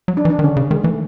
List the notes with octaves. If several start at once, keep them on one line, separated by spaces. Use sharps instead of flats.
F#3
D4
E3
D4
D#3
D3 C#4
C#3
D#3 G#3
E3 A3